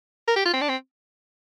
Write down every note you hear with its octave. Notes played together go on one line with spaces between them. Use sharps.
A#4
G4
F4
C4
D4
C4